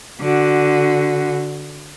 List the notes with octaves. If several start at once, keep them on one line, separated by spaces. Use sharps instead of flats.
D3 F#4